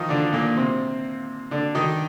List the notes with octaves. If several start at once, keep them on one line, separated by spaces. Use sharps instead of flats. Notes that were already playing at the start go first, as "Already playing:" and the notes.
Already playing: D#3 F3 D#4 F4
D3 D4
A#2 A#3
C3 C4
D3 D4
D#3 D#4